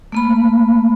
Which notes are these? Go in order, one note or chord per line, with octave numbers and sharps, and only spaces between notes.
A3 A#3 B5